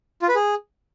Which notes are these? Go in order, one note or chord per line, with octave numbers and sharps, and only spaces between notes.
F4
B4
G#4